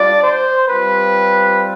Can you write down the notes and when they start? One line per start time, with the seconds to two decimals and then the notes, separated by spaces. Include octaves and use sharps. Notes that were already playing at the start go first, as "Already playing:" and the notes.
Already playing: G3 D4 F4 D5
0.23 C5
0.69 G3 C4 F4 B4